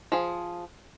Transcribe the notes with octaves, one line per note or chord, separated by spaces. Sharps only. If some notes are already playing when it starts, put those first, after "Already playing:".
F3 G#4